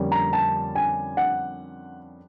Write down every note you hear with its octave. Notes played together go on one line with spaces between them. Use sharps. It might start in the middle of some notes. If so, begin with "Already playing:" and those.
Already playing: F2 D3 G3 A#3 C#4
A#5
A5
G#5
F#5